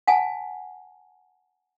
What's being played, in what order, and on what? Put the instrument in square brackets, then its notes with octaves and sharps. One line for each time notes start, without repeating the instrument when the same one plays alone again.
[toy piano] F#5 G#5 A5